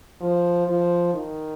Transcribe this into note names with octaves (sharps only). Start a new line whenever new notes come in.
F3
F3
D#3